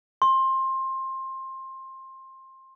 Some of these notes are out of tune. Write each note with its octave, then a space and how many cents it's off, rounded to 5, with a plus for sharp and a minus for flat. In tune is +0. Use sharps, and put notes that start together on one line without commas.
C6 +20